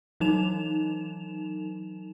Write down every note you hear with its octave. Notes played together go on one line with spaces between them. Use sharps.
E3 F#3 D#4 E7 F7